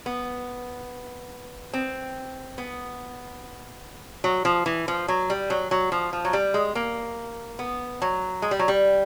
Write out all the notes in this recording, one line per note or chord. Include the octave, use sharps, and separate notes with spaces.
B3
C4
B3
F#3
F3
E3
F3
F#3
G3
F#3
F#3
F3
F3
F#3
G3
G#3
A#3
B3
F#3
G#3
G3
F#3
G3